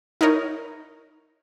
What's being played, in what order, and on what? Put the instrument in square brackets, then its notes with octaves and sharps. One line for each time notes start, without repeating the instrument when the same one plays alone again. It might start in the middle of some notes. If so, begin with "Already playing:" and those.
[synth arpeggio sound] D#4 E4 A#4 C#5